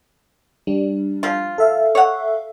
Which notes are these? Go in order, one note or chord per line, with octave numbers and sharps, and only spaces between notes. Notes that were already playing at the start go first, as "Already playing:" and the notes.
G3 D4
F3 F4
A4 E5 F5
C#5 F#5